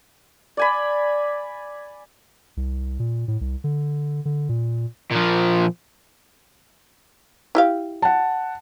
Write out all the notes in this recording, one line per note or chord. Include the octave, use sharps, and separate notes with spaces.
D5 G#5 B5
C2
A#2
A2
C2
D3
D3
A#2
A#2 F3
E4 G4 F5
F#5 A5